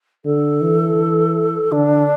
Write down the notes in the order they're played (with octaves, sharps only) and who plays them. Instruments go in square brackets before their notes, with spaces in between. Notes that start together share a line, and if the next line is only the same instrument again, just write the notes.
[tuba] D3 [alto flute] A4
[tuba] E3
[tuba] D3 [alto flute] D4